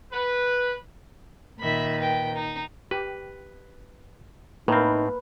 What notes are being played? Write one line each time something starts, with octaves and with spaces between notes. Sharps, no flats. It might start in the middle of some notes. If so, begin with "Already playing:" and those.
B4
A#2 D#3 E5 B5
B4 G5
D#4
G4 B4
A2 A#3 C4 D#4 A#4 B4